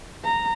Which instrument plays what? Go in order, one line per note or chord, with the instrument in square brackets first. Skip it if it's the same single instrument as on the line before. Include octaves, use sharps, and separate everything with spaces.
[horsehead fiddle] A#5